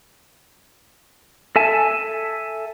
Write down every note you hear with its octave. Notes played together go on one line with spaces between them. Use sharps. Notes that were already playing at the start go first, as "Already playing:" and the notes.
A4 E5 G#5 A5